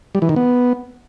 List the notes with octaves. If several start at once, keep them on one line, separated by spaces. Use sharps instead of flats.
G3
E3
D#3
B3